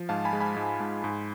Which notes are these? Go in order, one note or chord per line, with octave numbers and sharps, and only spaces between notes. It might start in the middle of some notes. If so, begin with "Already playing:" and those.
Already playing: F3
G#2 F5 A5
G#5 B5
G#3
G#5 B5
G#2
G#2
G#2